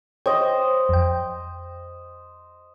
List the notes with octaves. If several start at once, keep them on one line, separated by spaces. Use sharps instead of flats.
C5 C#5 D#5 G5
F2 G5